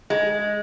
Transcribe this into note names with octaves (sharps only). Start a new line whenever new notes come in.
G#3